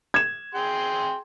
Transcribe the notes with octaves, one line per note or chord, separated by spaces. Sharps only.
G#6 E7
G#4 G5 C6